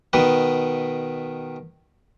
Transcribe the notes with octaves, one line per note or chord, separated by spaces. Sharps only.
B2 D#3 B4